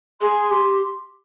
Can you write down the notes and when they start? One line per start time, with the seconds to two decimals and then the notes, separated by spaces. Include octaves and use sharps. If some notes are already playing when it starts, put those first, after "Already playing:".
0.20 G#4 C6
0.51 G4 C6